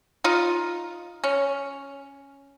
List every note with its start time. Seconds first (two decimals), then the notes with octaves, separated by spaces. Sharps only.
0.24 D#4 F4
1.24 C#4